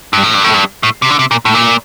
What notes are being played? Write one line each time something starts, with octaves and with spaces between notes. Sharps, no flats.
G2
A2
G2
A2
G2
A2
C3
D3
C3
A#2
A2
A#2